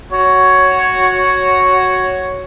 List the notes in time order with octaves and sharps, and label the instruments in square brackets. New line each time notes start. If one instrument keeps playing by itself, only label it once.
[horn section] F#4 C#5